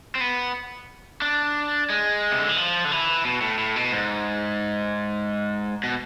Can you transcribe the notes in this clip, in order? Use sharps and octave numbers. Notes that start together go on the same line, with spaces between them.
C4
B3
D4
G#3
C3
D3
E3
F3
D3
E3
B2
A2
A2
B2
G#2
B2